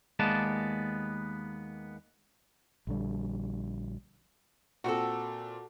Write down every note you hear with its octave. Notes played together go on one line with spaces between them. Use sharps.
D#2 G#3 A#3 B3 D5 A5
A#1 D3 G3
A#2 C4 F#4 A4